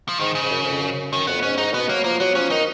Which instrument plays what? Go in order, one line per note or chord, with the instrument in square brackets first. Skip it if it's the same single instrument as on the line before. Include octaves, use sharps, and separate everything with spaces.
[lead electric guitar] F3
[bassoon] G#2 [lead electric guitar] D#3
[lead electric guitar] C#3
[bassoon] G#2
F#2
F2
F#2
[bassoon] F#2 [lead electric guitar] D#3
[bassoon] F2 [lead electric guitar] B3
[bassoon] G#2 [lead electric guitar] C#4
[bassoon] G#2 [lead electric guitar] D#4
[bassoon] B2 [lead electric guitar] B3
[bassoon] F#3 [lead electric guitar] A#3
[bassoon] F3 [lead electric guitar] A#3
[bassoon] F#3 [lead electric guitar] B3
[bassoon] F3 [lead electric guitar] C#4
[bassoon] D#3 [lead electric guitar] D#4